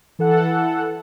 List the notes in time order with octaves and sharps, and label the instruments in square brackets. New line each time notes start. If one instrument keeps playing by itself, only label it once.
[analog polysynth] E3 A4 F#5